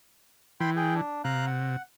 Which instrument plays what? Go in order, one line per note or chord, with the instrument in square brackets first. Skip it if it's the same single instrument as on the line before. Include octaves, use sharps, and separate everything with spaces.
[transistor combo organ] E3 [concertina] G5 B5 C6
[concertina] G#4 G5
D4
[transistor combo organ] C3 [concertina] F5 A#5 F#6
[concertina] F#5